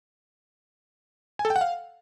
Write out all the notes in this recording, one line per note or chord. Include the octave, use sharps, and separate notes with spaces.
G#5
A4
G5
F#5
F5